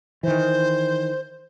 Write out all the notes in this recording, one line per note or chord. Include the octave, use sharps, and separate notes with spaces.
D#3 E3 C5